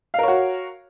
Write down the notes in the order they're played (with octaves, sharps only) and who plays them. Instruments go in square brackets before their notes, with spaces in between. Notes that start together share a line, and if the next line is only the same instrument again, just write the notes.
[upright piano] F5
A#4
C#5
F#4